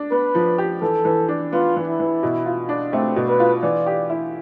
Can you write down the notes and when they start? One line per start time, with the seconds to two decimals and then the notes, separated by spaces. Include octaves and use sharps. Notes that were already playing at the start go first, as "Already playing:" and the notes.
Already playing: D4
0.11 B3 B4
0.35 F3
0.58 G4
0.82 E3 A4
1.05 E3
1.28 D4
1.53 B3 F4
1.76 E3
1.88 E4
2.00 E3
2.23 B2
2.46 F4
2.69 D4
2.93 A3 C4
3.16 B2
3.28 B4
3.40 F4
3.63 E3 D5
3.86 G4
4.10 E4